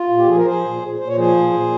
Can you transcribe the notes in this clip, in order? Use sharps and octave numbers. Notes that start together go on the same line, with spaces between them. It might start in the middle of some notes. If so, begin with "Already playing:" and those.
Already playing: F4
A#2
G4
F3 G#4
A#4
F3 G#4 C5
A#2
A#2
A#2 C5
C#5
F3 G#4 C5
A#2
A#2